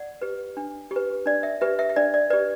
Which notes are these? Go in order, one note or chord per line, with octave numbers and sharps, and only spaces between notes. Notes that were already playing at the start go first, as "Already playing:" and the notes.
Already playing: D5 F#5
G4 B4
D4
G4
B4
D4 D5
E5
G4 B4 E5
E5
E5
D4 D5
D5
G4 B4 D5